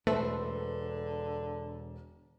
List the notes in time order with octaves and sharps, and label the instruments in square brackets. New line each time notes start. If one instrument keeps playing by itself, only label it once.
[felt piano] E1 [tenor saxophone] D3 [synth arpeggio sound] A3 [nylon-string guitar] B4 C5 E5